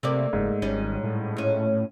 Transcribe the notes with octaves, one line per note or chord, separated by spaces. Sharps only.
C3 A3 A#3 D5
F#1 G#2
G#1 G3 C#4
A2
A#2 C#4